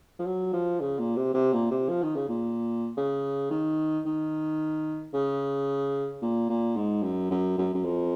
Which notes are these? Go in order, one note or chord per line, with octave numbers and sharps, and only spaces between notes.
F3
F#3
F3
C#3
A#2
C3
C3
A#2
C3
F3
D#3
C#3
A#2
C#3
D#3
D#3
C#3
A#2
A#2
G#2
F#2
F#2
F#2
F#2
F2